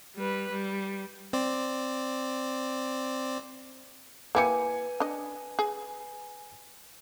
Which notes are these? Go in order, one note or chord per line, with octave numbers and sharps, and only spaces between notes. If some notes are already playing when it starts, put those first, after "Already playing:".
G3 B4
G3
C4 C5 D5
A#3 E4 G4 B4 G#5 C#7
D4 D#5
G#4